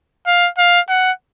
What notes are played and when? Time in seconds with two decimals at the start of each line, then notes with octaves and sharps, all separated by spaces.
0.27 F5
0.58 F5
0.89 F#5